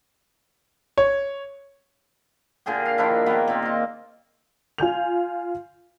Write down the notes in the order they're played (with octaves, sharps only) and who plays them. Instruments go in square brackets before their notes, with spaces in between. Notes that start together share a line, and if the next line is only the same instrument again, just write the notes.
[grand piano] C#5
[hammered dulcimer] A#2 D3 G#4 G5
F5
D#3 F3 D4 E4
D#3 A#3 B3
A#2 C4
F4 D#5
[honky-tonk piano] F4 G#5 G6 F7